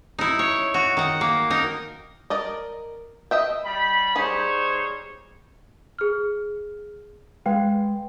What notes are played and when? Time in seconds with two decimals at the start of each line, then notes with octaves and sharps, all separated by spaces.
0.19 D#4 E4
0.39 C#5
0.74 F#4
0.97 D#3 F#5
1.21 A#3
1.50 D#4 A#4
2.30 A#4 D5 D#5
3.31 D#5 E5 G5
3.65 G3 B5
4.16 G3 D#4 G#4 C5 C#5
5.99 G#4 F6
7.46 G#3 B4 F5 G5